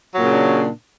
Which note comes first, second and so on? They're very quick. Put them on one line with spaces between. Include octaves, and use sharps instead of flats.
F#3 A#2 C#3 D4